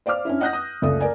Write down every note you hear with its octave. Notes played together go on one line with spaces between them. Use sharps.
C5 D5 F5 D6 F6
C#4 D4 E4
D#5 F#5 D#6 F#6 G6 A#6
D#6
F#1 C#2 A3 A4 D5 D#6
A#4 D5 G#5